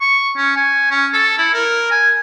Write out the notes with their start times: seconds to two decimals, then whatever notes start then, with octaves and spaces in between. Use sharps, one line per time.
0.01 C#6
0.37 C#4
0.56 G#5
0.91 C#4
1.13 A4
1.38 E4
1.54 A#4
1.91 G#5